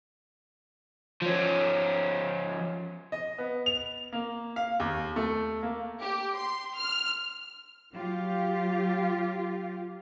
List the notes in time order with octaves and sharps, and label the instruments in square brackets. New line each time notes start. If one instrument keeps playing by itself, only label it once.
[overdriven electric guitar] F3 C#4
[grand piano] D#5
B3
F7
A#3
F5
D#2
A3
A#3
[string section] G4
C6
F6
[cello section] F#3 F4 G4